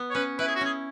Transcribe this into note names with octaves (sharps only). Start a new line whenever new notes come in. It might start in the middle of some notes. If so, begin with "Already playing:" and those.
Already playing: B3
C#5
C#4 B4
E4 B4
G#4
F#4
C#4 G#4